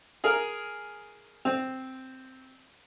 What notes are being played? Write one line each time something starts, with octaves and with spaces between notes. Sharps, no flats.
G#4 A#4
C4